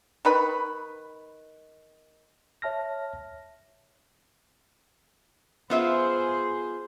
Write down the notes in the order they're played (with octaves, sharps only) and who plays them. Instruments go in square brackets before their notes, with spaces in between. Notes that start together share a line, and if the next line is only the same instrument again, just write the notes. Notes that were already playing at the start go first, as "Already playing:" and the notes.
[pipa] D#3 B4 B5
[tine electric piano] C#5 E5 A5 F6 A#6
[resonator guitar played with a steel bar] B3 F4 E5 [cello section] G#4 C5